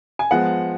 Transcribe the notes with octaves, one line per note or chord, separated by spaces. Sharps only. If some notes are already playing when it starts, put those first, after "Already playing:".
G#5
F3 G#3 B3 F#5